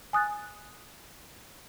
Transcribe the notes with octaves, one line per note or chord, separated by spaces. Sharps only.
G#5 D#6 F#6 A6